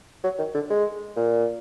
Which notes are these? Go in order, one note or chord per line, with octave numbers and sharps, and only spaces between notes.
F#3
D#3
D3
G#3
A#2